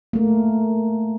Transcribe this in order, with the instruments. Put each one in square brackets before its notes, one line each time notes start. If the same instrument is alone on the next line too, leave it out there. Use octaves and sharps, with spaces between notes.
[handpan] A3 A#3